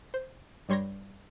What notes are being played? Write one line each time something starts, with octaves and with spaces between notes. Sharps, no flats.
C5
G2 G3 C#5 C6 G#6 A#6